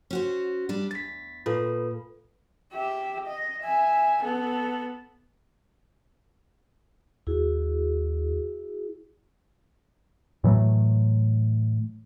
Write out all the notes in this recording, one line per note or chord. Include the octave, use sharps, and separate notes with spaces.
C#4 F#4 C5
G3 D4
E2 A6 B6
A#2 F4 A4 B4
G4 E5
D#5
E5 G#5
B3 A4
D#2 E4 F#4 G#4
A2 E3 F#3 A3